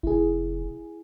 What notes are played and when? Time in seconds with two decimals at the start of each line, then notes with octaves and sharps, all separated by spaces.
0.03 F1 E4 G#4